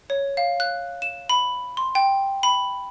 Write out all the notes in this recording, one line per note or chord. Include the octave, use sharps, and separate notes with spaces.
C#5
F5
F#6
E7
B5
C6
G5
B5